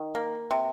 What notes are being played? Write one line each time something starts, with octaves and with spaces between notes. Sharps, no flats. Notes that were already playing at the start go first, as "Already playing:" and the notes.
Already playing: D#3
A#3
C3